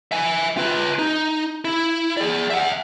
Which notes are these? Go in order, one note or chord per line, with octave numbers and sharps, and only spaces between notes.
E5 G#5
F4 B4
D#4
E4
G#4 D5
E5 F#5